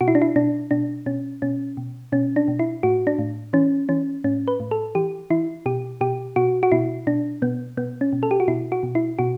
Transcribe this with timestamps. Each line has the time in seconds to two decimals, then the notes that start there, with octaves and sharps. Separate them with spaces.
0.01 B2 F#4
0.08 E4
0.15 D4
0.22 E4
0.36 B2 D4
0.71 B2 D4
1.06 B2 C#4
1.42 B2 C#4
1.77 B2
2.12 B2 C#4
2.36 D4
2.48 B2
2.59 E4
2.83 A2 F#4
3.07 D4
3.19 A2
3.53 E3 C#4
3.89 E3 C#4
4.24 A2 C#4
4.48 B4
4.60 A2
4.71 A4
4.95 E3 G4
5.30 E3 E4
5.66 B2 G4
6.01 B2 G4
6.36 B2 F#4
6.63 F#4
6.72 B2 E4
7.07 B2 D4
7.42 B2 B3
7.77 B2 B3
8.01 C#4
8.13 B2
8.23 A4
8.31 G4
8.40 F#4
8.48 B2 E4
8.72 F#4
8.83 B2
8.95 E4
9.19 B2 F#4